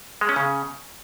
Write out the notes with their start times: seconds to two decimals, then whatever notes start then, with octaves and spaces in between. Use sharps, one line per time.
0.21 G#3
0.29 C#4
0.36 C#3